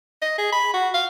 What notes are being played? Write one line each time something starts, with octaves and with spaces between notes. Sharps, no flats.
D#5
G#4
B5
F#4
F5